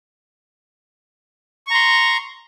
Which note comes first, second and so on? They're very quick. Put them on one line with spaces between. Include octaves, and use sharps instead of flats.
C#6 A#5 C6